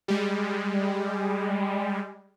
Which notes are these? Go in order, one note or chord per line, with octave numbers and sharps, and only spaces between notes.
G3 G#3